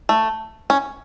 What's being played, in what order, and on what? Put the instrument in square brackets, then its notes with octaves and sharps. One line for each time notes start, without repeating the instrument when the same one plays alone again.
[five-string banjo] A3
C#4